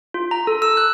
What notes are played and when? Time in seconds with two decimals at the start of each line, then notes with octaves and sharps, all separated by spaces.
0.14 F4
0.31 A#5
0.47 A4
0.62 E6
0.77 F#6